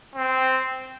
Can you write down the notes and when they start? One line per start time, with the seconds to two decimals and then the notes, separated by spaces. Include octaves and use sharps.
0.16 C4